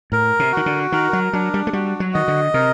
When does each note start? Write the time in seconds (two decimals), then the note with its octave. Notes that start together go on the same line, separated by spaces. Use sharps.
0.12 A2 A#4
0.39 C3
0.52 D#3 F#4
0.66 D3
0.92 D#3 A#4
1.13 F#3
1.33 F#3 D4
1.54 G3
1.67 A3
1.73 G3 F#4
2.00 F#3
2.14 D#3 D#5
2.28 D3
2.54 C3 A#4